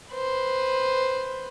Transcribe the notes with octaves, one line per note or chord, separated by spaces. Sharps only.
B4 C5